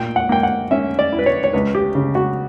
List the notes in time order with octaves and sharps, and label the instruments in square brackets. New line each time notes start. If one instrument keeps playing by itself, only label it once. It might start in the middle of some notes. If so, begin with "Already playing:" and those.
Already playing: [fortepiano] A#2 G5
F#5
A#3 G5
F#5
C#4 E5
D5
E4
B4
C#5
C#5
C#2 B4
G4
C#3
F#4